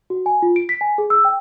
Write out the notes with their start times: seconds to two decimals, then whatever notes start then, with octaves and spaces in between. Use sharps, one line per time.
0.10 F#4
0.26 G#5
0.42 F4
0.56 D7
0.69 B6
0.81 G#5
0.98 G#4
1.10 E6
1.25 G5